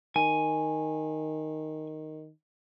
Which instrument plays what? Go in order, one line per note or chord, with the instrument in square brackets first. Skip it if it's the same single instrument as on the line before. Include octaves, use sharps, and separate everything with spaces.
[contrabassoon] D#3 [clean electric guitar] G#5